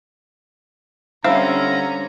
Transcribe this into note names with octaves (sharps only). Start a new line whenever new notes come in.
D3 G3 C4 C#4 E4 F5 A#5